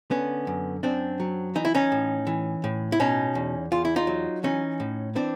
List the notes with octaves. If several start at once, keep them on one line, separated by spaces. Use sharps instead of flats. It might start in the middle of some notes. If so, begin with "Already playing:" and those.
D3 B3 C#4
F#2
F#2 C4 D4
F#3
E3 D#4
E4
C#4 D#4
A2
E3
A2
E4
B2 C#4 D#4
E2
E2 F4
E4
D#4 F4
F#3
E3 C#4 D#4
A2
E3 C4 D4